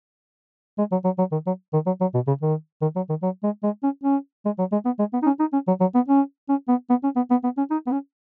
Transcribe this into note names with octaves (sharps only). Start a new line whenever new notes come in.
G#3
F#3
F#3
F#3
D#3
F#3
D#3
F#3
F#3
B2
C#3
D#3
D#3
F#3
D#3
F#3
G#3
G#3
C#4
C#4
G#3
F#3
G#3
B3
G#3
B3
D#4
C#4
D#4
C#4
F#3
F#3
B3
C#4
C#4
B3
B3
C#4
B3
B3
B3
C#4
D#4
B3
C#4